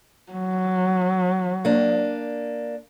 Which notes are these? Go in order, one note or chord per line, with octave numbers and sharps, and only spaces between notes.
F#3
A#3 D4